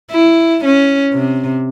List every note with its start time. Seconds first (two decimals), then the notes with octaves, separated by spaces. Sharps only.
0.11 E4
0.65 C#4
1.13 C3